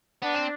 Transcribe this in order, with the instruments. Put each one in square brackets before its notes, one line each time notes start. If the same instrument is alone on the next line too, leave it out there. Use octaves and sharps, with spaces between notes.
[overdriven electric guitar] B3 [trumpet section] D4
[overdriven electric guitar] C4